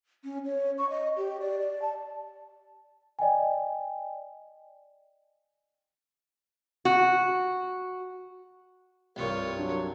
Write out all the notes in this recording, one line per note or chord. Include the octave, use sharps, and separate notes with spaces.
C#4
C#5
C#6
D#5
G4
D5
D5
A5
D5 D#5 G5 G#5
F#4
C2 G2 F4 A#4 C#5
F#3 D4